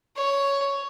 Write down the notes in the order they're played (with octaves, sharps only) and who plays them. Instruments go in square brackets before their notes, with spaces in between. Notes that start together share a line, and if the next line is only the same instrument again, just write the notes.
[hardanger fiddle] C#5